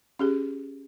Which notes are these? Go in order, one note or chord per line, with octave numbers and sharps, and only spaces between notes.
C#4 G4 G#4